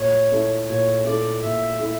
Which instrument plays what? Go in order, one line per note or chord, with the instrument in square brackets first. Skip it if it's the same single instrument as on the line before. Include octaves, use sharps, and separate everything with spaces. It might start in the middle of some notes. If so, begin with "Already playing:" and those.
Already playing: [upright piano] A#2 [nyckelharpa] C#5
[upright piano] A3 E4 A4
[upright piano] A#2 [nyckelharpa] C#5
[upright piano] A3 E4 A4 [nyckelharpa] D5
[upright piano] A#2 [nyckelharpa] E5
[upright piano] A3 E4